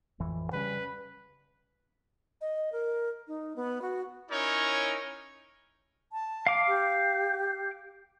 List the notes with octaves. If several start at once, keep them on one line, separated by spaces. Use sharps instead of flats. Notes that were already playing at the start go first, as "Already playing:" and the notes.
A1 F2 E3
C#3 G3 C#4 B4
D#5
A#4
D#4
B3
F#4
C#4 D#4 E4 A#4 C#5
A5
F5 D6
G4